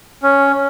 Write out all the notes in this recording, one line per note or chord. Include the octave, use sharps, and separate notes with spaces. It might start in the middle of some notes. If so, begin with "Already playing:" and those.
C#4